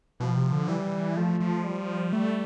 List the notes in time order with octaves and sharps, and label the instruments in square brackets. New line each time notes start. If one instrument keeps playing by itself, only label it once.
[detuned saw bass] B2 [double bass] F3
[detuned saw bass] C3
D3
[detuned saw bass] E3 [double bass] G3
[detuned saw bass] F3 [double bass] A3
[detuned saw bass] F3
[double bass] G3
[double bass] G3 [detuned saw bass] A3